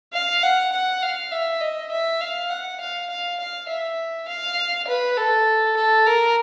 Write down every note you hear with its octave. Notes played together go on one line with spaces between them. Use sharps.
F5
F#5
F#5
F5
E5
D#5
E5
F5
F#5
F5
F5
F5
E5
F5
B4
A4
A4
A#4